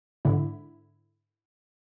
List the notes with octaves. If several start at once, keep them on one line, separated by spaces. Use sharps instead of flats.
G#2 D3 E4